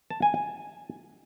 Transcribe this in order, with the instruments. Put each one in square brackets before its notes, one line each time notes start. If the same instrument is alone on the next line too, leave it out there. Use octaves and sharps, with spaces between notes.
[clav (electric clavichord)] A5
G#5
G#5